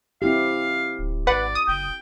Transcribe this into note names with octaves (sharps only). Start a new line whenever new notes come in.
C4 E4 G4 F5
D1
G#1 B4 D5 F#5
D#6
F#1 G5